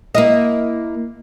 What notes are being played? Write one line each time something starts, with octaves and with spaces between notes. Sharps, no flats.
A#3 E4 D#5